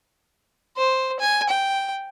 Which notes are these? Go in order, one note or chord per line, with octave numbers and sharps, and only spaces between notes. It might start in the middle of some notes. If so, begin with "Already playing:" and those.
C5
G#5
G5